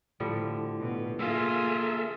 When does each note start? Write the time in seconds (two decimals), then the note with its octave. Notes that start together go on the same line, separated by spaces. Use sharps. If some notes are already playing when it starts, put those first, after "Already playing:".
0.20 A2 D3 F3 G3
0.79 B2
1.19 A#3 F4 G#4 A4 E5